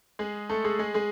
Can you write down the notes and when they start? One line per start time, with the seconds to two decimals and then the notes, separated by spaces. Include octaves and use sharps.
0.19 G#3 G#4
0.50 A3 A4
0.64 G#3 G#4
0.79 G#3 G#4
0.94 G#3 G#4